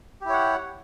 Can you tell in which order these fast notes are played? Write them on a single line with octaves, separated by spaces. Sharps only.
G4 E4 C#5 F#5